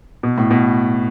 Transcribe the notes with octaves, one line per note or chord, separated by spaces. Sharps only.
B2
A2
B2